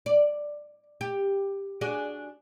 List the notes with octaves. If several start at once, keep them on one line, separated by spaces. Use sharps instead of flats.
D5
G4
D4 F#4 G#4